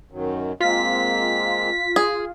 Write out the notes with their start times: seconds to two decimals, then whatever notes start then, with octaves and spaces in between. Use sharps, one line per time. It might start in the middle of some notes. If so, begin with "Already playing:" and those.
0.12 F#2 D#3 F#3
0.61 G#3 A#3 C4 F4 B6
1.96 G#4